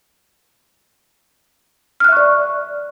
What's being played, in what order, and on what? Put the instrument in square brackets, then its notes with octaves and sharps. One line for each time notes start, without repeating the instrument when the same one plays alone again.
[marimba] F6
F#6
E5
C#6
D5